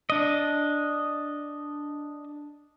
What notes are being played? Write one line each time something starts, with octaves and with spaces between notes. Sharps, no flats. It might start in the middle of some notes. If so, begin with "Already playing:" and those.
D4 D#5